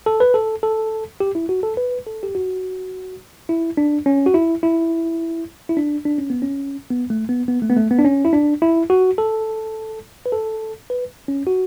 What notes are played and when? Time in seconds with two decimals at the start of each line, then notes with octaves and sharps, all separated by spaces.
0.06 A4
0.20 B4
0.34 A4
0.63 A4
1.20 G4
1.35 E4
1.49 F#4
1.63 A4
1.77 B4
2.07 A4
2.23 G4
2.35 F#4
3.49 E4
3.77 D4
4.06 C#4
4.26 F#4
4.34 E4
4.63 E4
5.69 E4
5.77 D4
6.05 D4
6.18 C#4
6.30 B3
6.42 C#4
6.90 B3
7.10 A3
7.29 B3
7.48 B3
7.62 A3
7.70 B3
7.77 A3
7.91 B3
7.99 D4
8.05 C#4
8.25 E4
8.33 D4
8.62 E4
8.90 F#4
9.18 A4
10.26 B4
10.32 A4
10.90 B4
11.28 C#4
11.47 F#4